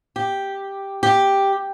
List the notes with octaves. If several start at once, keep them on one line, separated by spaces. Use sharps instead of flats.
G4
G4